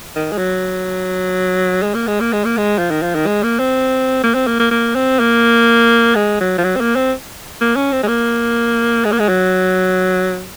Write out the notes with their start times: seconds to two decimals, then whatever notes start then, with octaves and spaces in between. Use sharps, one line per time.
0.15 D#3
0.32 G#3
0.38 F#3
1.83 G#3
1.95 A#3
2.07 G#3
2.21 A#3
2.33 G#3
2.45 A#3
2.57 G#3
2.78 F3
2.91 D#3
3.02 F3
3.15 D#3
3.26 G#3
3.43 A#3
3.59 C4
4.23 A#3
4.35 C4
4.47 A#3
4.60 A#3
4.71 A#3
4.95 C4
5.20 A#3
6.15 G#3
6.40 F#3
6.58 F3
6.64 F#3
6.76 C4
6.81 A#3
6.95 C4
7.61 A#3
7.76 C#4
7.92 C4
8.03 G#3
8.08 A#3
9.05 G#3
9.12 A#3
9.19 G#3
9.29 F#3